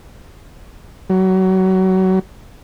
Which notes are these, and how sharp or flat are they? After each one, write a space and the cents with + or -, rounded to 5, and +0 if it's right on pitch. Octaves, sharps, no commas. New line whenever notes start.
F#3 +25